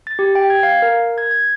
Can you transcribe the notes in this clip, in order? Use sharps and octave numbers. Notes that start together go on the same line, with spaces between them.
A6
G4
G5
G#6
F5
A#4
G#6
G#6